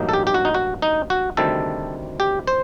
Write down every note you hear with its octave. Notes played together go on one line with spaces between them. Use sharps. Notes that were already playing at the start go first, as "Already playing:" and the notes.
Already playing: A1 G2 F#3 A#3 D#4
A4
G4
G4
F#4
D#4
F#4
D#4
F#4
D2 C3 D#3 G3 A4
G4
C5